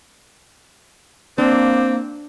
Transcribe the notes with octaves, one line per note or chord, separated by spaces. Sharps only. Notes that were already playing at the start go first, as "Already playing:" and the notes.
A#3 C4 D4